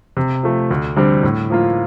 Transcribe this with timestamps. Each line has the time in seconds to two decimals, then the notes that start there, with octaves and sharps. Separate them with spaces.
0.17 C3
0.43 F3 A3
0.71 D2
0.96 D3 G3 C4
1.23 A2
1.50 F3 A#3 F4